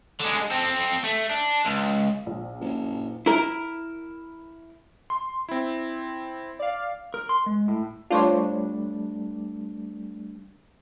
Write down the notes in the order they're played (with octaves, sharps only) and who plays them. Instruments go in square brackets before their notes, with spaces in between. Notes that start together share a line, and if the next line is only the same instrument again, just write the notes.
[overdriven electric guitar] D3 G#3
C4 A4
A3
D4
C#2
[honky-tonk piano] A#1
[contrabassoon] F#1
[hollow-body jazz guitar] E4 A#4
[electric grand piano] C6
C4 E4
[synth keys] D5 F5
[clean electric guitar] A#4
C6
G#3
A2
[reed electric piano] G3 A3 D4 [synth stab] F4 C5 C#5